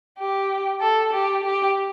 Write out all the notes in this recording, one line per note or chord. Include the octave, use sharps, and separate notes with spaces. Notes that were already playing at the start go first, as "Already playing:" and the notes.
G4
A4
G4
G4